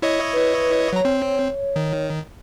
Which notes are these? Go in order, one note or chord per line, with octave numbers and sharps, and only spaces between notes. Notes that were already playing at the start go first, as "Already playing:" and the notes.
E4 C#5 D#5
B4
F#3 C#5 A#5
C4
D#3